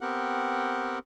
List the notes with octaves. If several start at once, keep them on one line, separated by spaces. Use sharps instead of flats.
B3 C4 G4 A#4 F#5